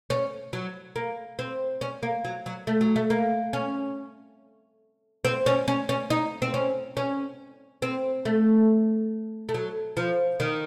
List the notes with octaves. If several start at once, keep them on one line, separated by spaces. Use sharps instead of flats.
C#4
F#3
A#3
C4
C#4
A#3
F#3
F#3
A3
F#3
A3
A#3
C#4
C4
C#4
C#4
C#4
D#4
C4
C#4
C#4
C4
A3
A3
F#3
F3
D#3